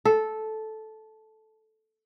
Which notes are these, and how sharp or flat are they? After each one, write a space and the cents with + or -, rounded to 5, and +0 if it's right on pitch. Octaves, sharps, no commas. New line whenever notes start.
A4 -10